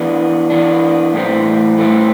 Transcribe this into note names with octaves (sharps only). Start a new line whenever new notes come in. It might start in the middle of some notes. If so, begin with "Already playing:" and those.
Already playing: E3 B3 D4
E3 B3 D4
A2 E3 A3 C4
A2 E3 A3 C4